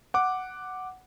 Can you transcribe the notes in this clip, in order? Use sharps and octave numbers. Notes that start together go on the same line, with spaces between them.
F#5 D6